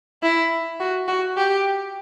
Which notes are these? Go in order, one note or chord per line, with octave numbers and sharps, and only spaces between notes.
E4
F#4
F#4
G4